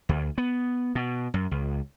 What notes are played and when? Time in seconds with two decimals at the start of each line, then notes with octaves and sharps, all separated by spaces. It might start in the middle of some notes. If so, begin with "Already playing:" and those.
0.09 D2
0.38 B3
0.95 B2
1.34 F#2
1.51 C#2